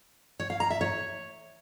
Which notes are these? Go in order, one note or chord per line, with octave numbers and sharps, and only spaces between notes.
C#5
F5
A#5
E5
C#5